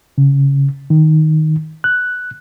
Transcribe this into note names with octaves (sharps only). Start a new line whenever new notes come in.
C#3
D#3
F#6